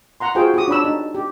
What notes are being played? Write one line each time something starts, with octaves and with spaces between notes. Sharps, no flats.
F#5 A#5 C6
F4 F#4 G#4 C5 G5
F#4 G4 D#6
D4 C#5 B5 E6
D#4
G4